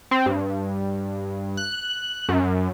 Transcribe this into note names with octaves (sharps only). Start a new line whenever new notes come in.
C4
G2
F#6
F#2